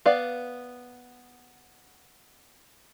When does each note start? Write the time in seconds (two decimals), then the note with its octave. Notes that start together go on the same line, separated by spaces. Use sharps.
0.06 B3 D5 F5